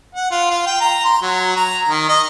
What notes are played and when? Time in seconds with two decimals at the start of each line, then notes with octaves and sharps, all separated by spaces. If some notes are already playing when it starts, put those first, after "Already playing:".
0.15 F#5
0.31 F4
0.50 F4
0.66 G5
0.81 A#5
1.05 C6
1.22 F#3
1.56 A#5
1.89 D#3
2.09 D#5